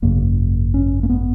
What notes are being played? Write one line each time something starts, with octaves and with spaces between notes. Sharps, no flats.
G#1 F#2 C#3 A#3
C#4
A#3
B3